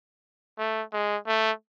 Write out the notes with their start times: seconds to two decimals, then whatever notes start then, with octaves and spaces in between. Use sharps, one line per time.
0.58 A3
0.93 G#3
1.27 A3